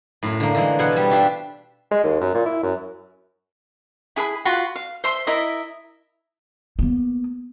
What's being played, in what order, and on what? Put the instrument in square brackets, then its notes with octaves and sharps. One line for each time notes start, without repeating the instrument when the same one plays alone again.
[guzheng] F#2 A2
D3 A#3
D3 E3 G#3
B2 B3 C5 C#5 F#5
G3 A5
D4 F4 G4 E5
[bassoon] G#3
D#2
F#2
A#2
E4
F#2
[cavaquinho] E4 G#4 F#5 B5
F4 F#4 B5
F5
C5 E5 C6
E4 A#4 D#5 E5
[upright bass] A#3 B3